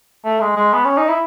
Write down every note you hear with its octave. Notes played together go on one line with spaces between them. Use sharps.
A3
G#3
G#3
B3
C#4
D#4
E4